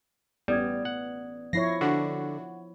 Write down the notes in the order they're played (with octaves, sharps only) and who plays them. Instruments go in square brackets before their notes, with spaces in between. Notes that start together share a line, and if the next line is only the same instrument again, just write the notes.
[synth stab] A1 [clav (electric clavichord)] G3 [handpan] B3 [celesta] D5 D#6 G#6
[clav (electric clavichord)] F#5
[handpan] F3 E4 C#5 [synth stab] A#6 C7
[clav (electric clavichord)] D3 [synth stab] D4 F#4 [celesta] F#5